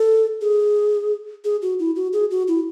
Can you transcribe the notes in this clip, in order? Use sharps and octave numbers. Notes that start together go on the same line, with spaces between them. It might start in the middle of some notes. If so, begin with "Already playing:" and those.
Already playing: A4
G#4
G#4
F#4
E4
F#4
G#4
F#4
E4